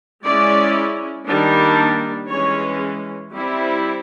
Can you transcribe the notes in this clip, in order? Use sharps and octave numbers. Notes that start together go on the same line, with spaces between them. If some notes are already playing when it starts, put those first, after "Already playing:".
G#3 C#4 E4 D5
D#3 G3 A#3 D4
E3 G#3 C#4 C#5
G3 C4 E4